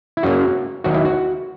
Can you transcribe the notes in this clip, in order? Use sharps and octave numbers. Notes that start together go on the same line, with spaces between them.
E4
F#2 C#3 F#3 A#3 F#4
D#2 D#3 F#3 F#4
E4
F#4